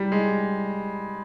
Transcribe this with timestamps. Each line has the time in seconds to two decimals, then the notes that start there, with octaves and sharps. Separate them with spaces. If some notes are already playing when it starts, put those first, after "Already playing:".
Already playing: G3
0.12 G#3